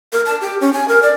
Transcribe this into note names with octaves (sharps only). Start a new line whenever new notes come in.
A#4
A5
G4
C#4
G#5
A#4
D5